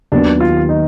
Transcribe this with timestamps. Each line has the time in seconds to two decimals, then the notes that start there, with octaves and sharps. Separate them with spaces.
0.12 D#2 D#3 F#3 B3 D4
0.40 F4
0.69 D#4